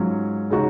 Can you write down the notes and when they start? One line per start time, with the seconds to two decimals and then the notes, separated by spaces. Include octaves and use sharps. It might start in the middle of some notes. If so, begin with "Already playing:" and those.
Already playing: G#2 F#3 C#4 F4
0.50 C#3 G#3 D#4 F#4